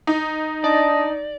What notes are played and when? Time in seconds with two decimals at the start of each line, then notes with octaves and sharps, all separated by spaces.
0.07 D#4
0.64 D4 D5 D#5